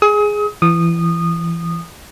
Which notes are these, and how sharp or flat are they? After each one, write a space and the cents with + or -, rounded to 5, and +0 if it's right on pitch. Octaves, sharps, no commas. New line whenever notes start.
G#4 +0 D#6 +35
E3 +30 D#6 -20